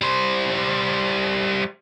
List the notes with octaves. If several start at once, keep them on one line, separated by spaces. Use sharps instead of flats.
G3 C5